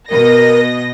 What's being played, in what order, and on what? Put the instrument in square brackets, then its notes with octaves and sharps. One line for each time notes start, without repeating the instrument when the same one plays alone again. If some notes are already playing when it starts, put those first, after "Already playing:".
[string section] B2 D#5 A#6 [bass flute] A#4